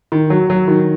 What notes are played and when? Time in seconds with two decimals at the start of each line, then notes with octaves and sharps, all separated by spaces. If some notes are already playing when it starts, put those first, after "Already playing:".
0.12 D#3
0.30 F#3
0.50 F#3
0.68 D#3